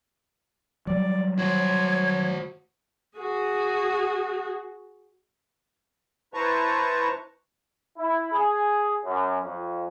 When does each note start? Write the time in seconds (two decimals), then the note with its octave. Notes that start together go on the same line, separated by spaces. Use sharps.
0.87 F#3 G3 D5
1.39 F#4 C5 C#5 G#6
3.18 F#4 G#4
6.34 E4 B4 C5 A5 A#5 C#6
7.98 E4
8.32 G#4
9.05 F#2
9.42 F2